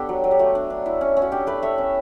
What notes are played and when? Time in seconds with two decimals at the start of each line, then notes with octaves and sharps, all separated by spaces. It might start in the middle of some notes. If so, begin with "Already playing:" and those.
Already playing: B3 D4 G4 A4
0.09 F#3
0.24 F#3
0.31 G4
0.39 A3 F#4
0.55 D4
0.70 D4
0.86 E4
1.01 C#4
1.17 C#4
1.22 F#4
1.32 D4 G4
1.47 A3 B4 D5
1.62 A3 C#5 E5
1.78 C#4